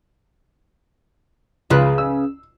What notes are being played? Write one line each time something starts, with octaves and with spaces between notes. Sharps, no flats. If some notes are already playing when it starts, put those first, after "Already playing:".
C#2 C#3 F4 B4 F#6
E6